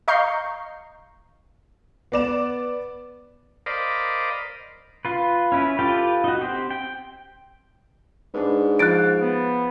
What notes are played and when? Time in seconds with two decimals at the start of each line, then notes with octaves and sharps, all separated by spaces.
0.08 D#5 F5 A#5 C#6 G6 C7
2.12 B3 D5 E7
3.66 A#4 C5 D5 D#5 F5 B5
5.05 F4 B4
5.52 C#4 E4 B4
5.79 F4 G4 A4 B4 G5
6.24 D#4 F#4
6.41 C4 G4
6.71 G5
8.34 G#2 D4 B4
8.79 F3 C5 F#6 A6 D7
9.21 B3